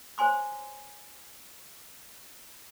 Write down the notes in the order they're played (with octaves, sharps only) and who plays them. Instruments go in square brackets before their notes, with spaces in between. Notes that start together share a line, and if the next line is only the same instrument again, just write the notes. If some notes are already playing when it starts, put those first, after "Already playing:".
[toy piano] C5 C#5 G#5 C6 D6